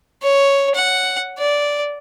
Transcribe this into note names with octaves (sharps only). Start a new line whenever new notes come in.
C#5
F#5
D5